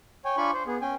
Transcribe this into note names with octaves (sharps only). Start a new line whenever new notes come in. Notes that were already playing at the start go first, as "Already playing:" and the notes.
C#5 G5 G#5
D4 F4 G#5 B5 C#6
C5
B3 G#4
C#4 G5 G#5